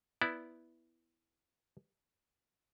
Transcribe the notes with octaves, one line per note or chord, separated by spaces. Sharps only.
B3 E4 D5